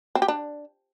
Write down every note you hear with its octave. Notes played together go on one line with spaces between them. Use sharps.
C4
G4
D4